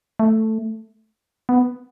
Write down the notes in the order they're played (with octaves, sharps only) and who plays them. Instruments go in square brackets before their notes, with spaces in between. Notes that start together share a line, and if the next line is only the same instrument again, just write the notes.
[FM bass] A3
B3